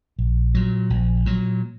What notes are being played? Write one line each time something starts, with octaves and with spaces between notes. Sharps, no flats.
A#1
A#2 F#3
A#1
A#2 F#3